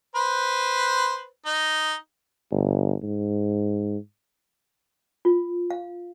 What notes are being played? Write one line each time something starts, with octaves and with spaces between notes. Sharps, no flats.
B4 C5
D#4
G1
G#2
F4
F5